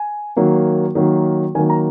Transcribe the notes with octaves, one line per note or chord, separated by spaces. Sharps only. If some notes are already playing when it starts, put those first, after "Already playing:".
Already playing: G#5
D#3 F#3 A#3
D#3 F#3 A#3
D#3 F#3 A#3 G#5
A#5